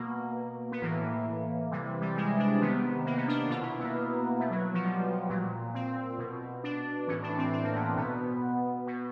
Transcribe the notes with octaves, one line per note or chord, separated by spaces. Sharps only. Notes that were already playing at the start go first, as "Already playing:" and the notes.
Already playing: B2 A#3
B3
A2 E3 A#3
C3 E3 G3
G3
G#3
D4
C3 D#3 B3
A#3
B3
D4
D4
B2 F4
E4
B3
A#3
B2 A3
F#3
F3
G3
A#2 F#3
C4
B2
D4
A2 E3 C#4
D4
C4
C4
A#3
B3
B2 B3
B2